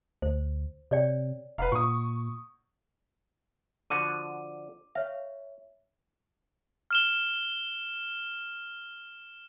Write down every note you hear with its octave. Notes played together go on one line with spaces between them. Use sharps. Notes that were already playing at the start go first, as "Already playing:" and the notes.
D2 C5
C3 C#5 D5 G5
F1 B4 F5 F#5 A#5
A#2 C#6 D#6
D3 F3 F#4 D6 D#7
C#5 E5 F5
F6 E7 G7